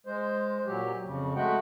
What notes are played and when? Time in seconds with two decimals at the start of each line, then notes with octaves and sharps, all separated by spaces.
0.06 G#3 C5
0.66 A#2 F#3 G4
1.05 F2 C#3
1.36 G#3 A3 F#4 F#5 G5